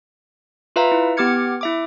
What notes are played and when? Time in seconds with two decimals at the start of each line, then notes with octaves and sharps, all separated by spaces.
0.76 F4 B4 E5 F5 A#5
0.92 E4
1.17 B3 G4 D6 F6 G#6 C#7
1.61 E4 E5 D6